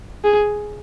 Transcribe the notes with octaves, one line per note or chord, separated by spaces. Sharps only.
G#4